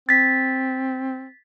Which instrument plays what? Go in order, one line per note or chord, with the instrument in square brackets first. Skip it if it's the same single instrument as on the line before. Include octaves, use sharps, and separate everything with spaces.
[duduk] C4 [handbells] A6 B6